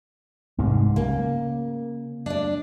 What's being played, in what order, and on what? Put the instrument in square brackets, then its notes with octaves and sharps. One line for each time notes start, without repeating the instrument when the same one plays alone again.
[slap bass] C2 G#2 G#3
[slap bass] C#3 [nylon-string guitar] A#3
[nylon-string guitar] D4 D5